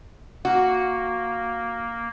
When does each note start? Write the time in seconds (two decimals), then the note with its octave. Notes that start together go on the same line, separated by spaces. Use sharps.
0.45 A#3 F#4